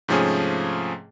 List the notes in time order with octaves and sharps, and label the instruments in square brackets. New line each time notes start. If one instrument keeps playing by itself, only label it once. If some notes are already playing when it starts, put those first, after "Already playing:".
[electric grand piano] G#2 C3 F3 A3 C#4 G#4